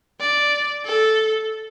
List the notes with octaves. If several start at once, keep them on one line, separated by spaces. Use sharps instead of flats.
D5
A4